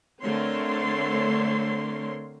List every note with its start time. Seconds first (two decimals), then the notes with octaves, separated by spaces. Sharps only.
0.21 D3 A3 C4 A#4 C#5 C6